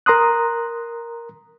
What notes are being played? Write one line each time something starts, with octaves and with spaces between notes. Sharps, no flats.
A#4 A#5 C6 D#6 F#6